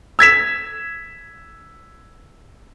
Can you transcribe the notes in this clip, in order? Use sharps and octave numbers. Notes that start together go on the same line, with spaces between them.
E6 G#6 B6 E7